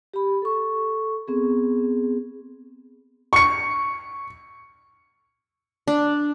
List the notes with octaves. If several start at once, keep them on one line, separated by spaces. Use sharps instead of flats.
G4 B5
A4 C#6
B3 C4 G#4
C#6 C#7
D4